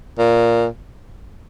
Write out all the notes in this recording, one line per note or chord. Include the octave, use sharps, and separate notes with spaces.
A#2